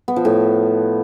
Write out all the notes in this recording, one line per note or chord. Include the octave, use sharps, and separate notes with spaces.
B3
F3
A2